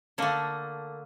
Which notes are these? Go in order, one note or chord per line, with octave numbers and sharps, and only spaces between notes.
D3 A3 A#3